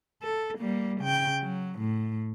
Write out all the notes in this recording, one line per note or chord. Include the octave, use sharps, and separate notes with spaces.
A4
G3 A#3
C#3 G5
F#3
A2